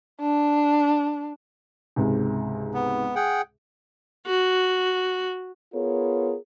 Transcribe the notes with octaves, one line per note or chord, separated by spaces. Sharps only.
D4
C#2 G#2 C3
B3
G#4 F#5 G5
F#4
B3 F4 G#4 A#4 C#5